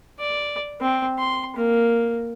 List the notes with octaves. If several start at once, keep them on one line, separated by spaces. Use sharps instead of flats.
D5
C4
C6
A#3